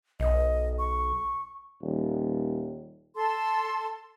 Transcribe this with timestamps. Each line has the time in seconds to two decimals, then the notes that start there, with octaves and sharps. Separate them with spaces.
0.20 B1 D#5
0.78 C#6
1.82 D#1
3.16 A4 C6